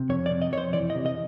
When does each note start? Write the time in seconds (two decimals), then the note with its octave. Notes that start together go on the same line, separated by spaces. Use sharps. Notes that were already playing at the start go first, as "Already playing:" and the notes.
Already playing: C3
0.09 F2 C#5
0.26 D5
0.31 C3
0.42 D#5
0.52 F2 C#5
0.58 C5
0.73 E3 D5
0.90 D#5
0.95 C3
1.06 D#5